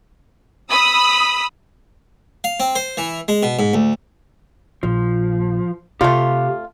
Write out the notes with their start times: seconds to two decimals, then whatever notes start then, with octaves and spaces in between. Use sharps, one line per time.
0.70 B5 D#6 E6
2.44 F5
2.60 C4
2.76 C5
2.97 E3
3.28 G#3
3.43 B2
3.59 G#2
3.74 D2
4.83 A#1 F3
6.01 C3 A3 C4 F4 G4 F5